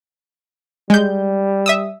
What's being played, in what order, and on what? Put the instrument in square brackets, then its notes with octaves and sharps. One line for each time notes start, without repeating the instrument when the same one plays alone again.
[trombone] G3 [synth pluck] G#3 G6
[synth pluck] E5 D#6 E6